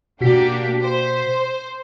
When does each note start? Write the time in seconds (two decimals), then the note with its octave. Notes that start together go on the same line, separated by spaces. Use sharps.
0.21 B2 A#3 D4 F#4 G4 B6
0.82 C5